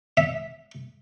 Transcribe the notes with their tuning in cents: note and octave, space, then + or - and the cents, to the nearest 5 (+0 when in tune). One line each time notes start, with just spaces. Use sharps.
E5 -10